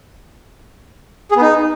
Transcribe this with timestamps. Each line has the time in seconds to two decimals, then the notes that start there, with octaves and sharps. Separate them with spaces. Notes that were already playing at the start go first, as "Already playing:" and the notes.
1.31 G#4
1.36 B3
1.41 D#4